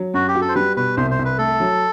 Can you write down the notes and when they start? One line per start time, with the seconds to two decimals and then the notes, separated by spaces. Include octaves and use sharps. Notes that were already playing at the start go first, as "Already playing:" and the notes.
Already playing: F#3
0.14 F#2 F#4
0.28 G4
0.35 F#4
0.41 A4
0.49 C5
0.55 G3 B4
0.76 B2 B4
0.97 C2 C5
1.11 C5
1.19 C2
1.25 B4
1.38 A3 A4
1.60 F#3